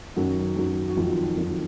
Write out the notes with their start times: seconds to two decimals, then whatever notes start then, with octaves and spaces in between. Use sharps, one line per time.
0.16 F#2 D#3 F#3 F#4
0.57 F#2 D#3 F#3
0.89 F#4
0.96 F2 D#3 F#3 F4
1.36 F2 D#3 F#3